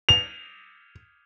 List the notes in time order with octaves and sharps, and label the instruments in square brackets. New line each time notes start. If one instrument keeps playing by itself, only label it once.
[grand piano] F7